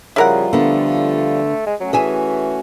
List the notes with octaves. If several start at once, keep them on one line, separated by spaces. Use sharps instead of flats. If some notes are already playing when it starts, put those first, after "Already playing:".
C#3 F3 G3 E4 F4 A#4 F#5
D3 A3 B3
G#3
F#3 A3 C#4 F#4
E3 G#4 E5 G#5